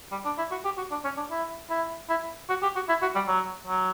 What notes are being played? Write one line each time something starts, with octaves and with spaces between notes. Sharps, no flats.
G3
D4
E4
F#4
G4
F#4
D4
C#4
D4
E4
E4
E4
F#4
G4
F#4
E4
F#4
G3
F#3
F#3